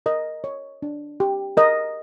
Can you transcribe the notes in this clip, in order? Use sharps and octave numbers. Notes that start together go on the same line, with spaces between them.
A#4 D#5
C#5
D4
G4
A#4 D#5